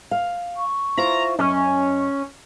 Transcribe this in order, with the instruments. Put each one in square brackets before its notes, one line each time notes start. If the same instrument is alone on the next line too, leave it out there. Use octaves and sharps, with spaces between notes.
[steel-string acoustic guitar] F5
[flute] C#6
[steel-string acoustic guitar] E4 F4 C5 [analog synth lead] A#5
[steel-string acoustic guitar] F#2 D#5 [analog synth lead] C#4 [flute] C#6